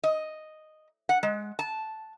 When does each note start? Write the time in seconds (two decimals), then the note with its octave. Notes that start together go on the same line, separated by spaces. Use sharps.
0.04 D#5
1.09 F#5
1.23 G#3
1.59 A5